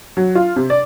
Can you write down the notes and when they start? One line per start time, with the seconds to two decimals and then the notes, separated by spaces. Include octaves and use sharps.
0.17 F#3
0.35 F4
0.56 C3
0.70 D5